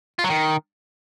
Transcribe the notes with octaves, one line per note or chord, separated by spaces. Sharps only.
F4
F#3
D#3